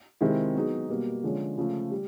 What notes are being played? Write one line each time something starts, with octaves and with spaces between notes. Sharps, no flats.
C3 D#3 G#3 C4 E4
F#3 B3 D#4 G#4
B2 G3 A#3
D3 F3 G#3 C#4
C#3 F3 A3
G3